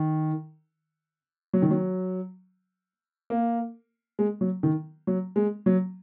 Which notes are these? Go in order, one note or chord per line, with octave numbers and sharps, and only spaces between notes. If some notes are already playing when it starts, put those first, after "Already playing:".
Already playing: D#3
F#3
D#3
F#3
A#3
G#3
F#3
D#3
F#3
G#3
F#3